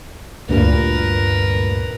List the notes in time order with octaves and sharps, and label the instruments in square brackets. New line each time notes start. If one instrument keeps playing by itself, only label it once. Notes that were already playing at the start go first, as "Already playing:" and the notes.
[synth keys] D2 G2 A#2 [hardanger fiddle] A#4 B4